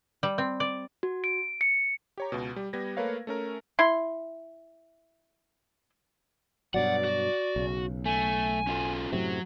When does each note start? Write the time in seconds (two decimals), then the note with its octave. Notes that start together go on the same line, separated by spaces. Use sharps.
0.23 G3
0.38 C4
0.60 D5
1.03 F#4
1.24 D7
1.61 C#7
2.18 G4 C#5 A#5
2.32 C#2 B2
2.56 G3
2.73 G3 B3 G#6 A#6
2.97 A3 A#3 A#4 B4 C#5 F5
3.27 A3 C#4 A#4
3.79 E4 C6
6.74 G2 B2 F#3 D5 F#5
7.04 F#4
7.56 B1 C#3
8.06 A3 G#5
8.67 C#4 F4 A4
9.13 F#2 A2 C3 F#3